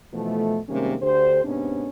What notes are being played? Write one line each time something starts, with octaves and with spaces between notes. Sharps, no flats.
B2 E3 F3 A3
C3 D#3 G3 G#3 A#3 C#4
D2 D3 G4 C5
G#2 C3 B3 C#4 D4